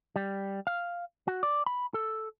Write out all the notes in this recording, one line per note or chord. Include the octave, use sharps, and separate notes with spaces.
G3
F5
F#4
D5
B5
A4